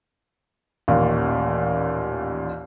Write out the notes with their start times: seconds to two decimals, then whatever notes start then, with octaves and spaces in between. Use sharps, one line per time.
0.88 A1 D#2 A#2